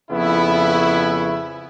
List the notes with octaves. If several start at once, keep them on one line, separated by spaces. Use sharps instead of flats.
F2 C#3 B3 E4